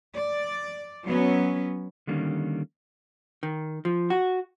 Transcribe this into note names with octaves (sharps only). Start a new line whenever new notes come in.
D5
F#3 B3 C#4
D3 D#3 G3 A#3 C#4
D#3
F3
F#4